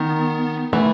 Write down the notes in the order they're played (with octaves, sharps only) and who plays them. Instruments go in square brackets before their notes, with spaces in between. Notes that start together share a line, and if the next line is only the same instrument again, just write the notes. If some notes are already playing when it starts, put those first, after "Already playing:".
Already playing: [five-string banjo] D#3 [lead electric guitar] B3
[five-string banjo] E3 [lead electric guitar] A3